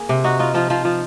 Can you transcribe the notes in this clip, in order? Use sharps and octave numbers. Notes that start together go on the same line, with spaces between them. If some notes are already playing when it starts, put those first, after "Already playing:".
Already playing: A#3 G#4
C3
D#4 F#4
D#4 F4
F3 F4
F3 F4
F3